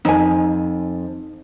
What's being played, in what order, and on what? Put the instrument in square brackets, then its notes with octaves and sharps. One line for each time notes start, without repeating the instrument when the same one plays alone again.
[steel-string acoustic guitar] F2 [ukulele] D#4 G#5